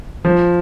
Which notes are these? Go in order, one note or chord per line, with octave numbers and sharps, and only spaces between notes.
F3